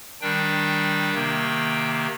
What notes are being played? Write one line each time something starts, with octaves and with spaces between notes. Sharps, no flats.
D#3 G3 D4 G5
C3 D#3 A#3